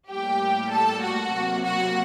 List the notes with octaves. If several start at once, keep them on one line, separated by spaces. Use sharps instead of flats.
A2 G3 A#3 G4 G5
A4 A5
F#4 F#5
C3 F#3 A#3
F#4 F#5